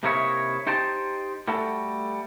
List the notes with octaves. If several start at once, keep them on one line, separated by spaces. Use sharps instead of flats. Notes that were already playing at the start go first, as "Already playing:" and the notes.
C3 A#3 D#4 E4 C#5 E5
D#4 G4 C5 G5 A5
G3 A3 F#4 A4